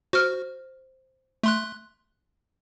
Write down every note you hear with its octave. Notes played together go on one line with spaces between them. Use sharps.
F#4 C5 F6
A3 C6 F#6